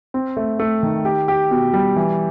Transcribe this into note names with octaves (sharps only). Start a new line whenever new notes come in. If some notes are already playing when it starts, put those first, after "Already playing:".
C4
A3
A3
D#3
G4
G4
B2
G3
E3